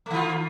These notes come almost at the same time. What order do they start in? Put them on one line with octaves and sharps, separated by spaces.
A3 D#3 F4